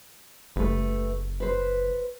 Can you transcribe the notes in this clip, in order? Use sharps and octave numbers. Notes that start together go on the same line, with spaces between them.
F#1 A3 G4 B4
B4 C5